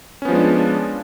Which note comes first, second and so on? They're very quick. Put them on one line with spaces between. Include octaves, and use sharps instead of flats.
C#4 B3 F3 G#3 D4